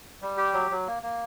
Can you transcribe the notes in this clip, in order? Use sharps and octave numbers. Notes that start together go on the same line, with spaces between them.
G3
G4
F#3
F#3
A#3
A#3